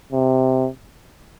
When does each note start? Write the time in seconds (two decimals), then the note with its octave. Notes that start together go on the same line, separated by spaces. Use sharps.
0.13 C3